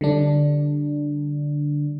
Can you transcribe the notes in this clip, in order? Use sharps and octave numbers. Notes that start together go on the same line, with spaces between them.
D3 G3 D4